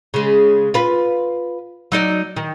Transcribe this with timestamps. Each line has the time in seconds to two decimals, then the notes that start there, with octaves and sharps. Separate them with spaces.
0.14 C#3 G#3
0.74 F4 B4
1.92 F#3 D#4 D5
2.36 D#3